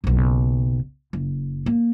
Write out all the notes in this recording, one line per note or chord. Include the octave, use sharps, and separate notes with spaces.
F#1 B1
F#1
A#3